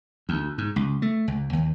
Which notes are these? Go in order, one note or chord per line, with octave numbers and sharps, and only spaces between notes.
D2
G#2
C#2
A3
C#2
D#2